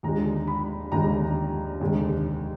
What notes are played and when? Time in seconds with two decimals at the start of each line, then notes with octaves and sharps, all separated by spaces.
0.03 D#2 D3 F3 G#3 A#5
0.47 B5
0.92 D#2 D3 F3 G#3 A#5
1.80 F1 D#2 D3 G#3